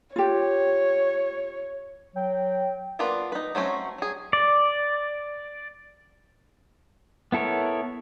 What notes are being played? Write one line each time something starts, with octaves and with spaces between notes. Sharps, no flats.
F4 G4 C#5
F#3 G5
A#3 B3 D4 F4 B4
D#4 B4
F#3 A3 C4 C#4 F#4
F#3 G#4
D5
B3 E4 A4 A#4 C#5